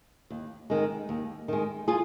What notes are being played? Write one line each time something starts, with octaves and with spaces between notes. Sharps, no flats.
D#2
D#3 G#3
D#2
D#3 G#3
F4 G#4